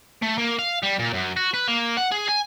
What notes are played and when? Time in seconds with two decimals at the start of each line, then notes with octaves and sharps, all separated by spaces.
0.22 A3
0.38 A#3
0.59 F5
0.83 G3
0.99 A#2
1.13 F#2
1.37 F#4
1.54 B4
1.68 A#3
1.97 F#5
2.11 G#4
2.28 G#5